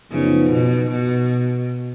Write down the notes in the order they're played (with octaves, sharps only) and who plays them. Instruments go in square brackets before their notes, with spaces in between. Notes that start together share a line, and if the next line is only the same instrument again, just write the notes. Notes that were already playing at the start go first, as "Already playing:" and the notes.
[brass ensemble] F#2 F3 B3 D#4 [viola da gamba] C#3
[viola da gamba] B2
B2